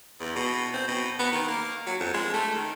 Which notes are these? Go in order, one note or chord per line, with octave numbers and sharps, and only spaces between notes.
E2
B2
C4
B2
B3
D#3
A#3
F#3
F2
G#3
A3
D#3